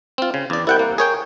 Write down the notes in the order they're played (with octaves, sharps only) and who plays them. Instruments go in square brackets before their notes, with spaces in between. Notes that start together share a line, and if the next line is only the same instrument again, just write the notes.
[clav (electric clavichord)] C4 F4
C#3
E2 D5
[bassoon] C2 [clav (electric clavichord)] E4 F#5 G5
[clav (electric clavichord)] A#3
[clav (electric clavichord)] G#4 C#5 G5 [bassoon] A#4